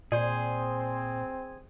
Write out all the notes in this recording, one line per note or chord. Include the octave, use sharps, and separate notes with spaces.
A#2 C4 G#4 C5 D5